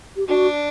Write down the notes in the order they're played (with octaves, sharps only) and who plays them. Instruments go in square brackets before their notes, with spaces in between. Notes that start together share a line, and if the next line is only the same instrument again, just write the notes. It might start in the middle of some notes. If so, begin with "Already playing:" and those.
[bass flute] G4
[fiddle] D4 [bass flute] F#4